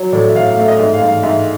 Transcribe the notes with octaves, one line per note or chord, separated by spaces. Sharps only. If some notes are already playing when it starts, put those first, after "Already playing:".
Already playing: F#3
A2 D5
E5
A2 F5
F5
A3 E5
D#5
G#2 E5
F5
G#2
F5
G#2 E5